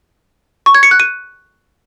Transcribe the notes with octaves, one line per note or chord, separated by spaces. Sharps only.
C#6
G#6
C#7
F#6
D#7